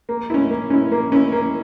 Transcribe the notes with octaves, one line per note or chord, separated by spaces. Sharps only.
A#3
C#4 E4
A#3
C#4 E4
A#3
C#4 E4
A#3